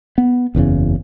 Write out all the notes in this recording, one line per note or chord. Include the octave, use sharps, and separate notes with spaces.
B3
F#1 E2 G2 C#3